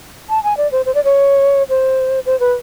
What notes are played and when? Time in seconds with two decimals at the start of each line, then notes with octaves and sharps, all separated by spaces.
0.29 A5
0.44 G#5
0.57 D5
0.72 C5
0.86 C5
0.95 D5
1.04 C#5
1.69 C5
2.26 C5
2.40 B4